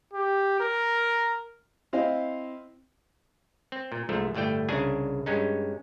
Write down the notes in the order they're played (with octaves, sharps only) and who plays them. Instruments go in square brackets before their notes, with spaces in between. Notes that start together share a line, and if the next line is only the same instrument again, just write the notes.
[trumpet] G4
A#4
[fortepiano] C4 E4 C5 D#5 F5
[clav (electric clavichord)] C4
A#2
C2 G#2 F3 A3
G1 A2 A3 D5 G5
C2 C#3 D4 G#4 G#5
G2 G#3 C#4 D#4